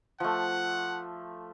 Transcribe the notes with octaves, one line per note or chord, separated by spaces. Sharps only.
F3 A3 F#5